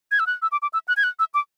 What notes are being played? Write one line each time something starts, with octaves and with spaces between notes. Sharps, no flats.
G#6
E6
F#6
E6
D6
D6
E6
F#6
G#6
F#6
E6
D6